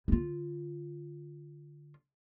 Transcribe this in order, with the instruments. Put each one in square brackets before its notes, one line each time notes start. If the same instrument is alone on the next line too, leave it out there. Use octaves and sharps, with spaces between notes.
[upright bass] D3 F4